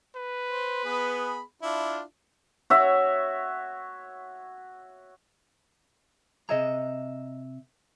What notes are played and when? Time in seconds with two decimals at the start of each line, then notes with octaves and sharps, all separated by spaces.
0.16 B4
0.49 C5
0.85 B3 G#4 B5
1.62 D4 E4 F4
2.70 F#4 C#5 E5
6.49 C3 G#4 D#5 E5 A#5